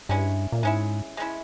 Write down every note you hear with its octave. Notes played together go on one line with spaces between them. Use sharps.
G2 G#3 C#4 E4
A#2
G#2 G#3 C#4 E4
G#3 C#4 E4